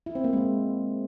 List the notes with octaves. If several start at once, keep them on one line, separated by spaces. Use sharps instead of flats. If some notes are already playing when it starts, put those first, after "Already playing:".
E4
C4
A#3
G#3